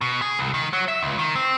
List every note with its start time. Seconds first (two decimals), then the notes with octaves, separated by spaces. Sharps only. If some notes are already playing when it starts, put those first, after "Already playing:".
0.01 B2
0.22 G#4
0.39 C2
0.54 D#3
0.73 F#3
0.88 E5
1.02 C#2
1.19 D#3
1.35 C4